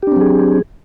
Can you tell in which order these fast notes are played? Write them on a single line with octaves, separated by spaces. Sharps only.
G4 D4 C4 F#3 G#4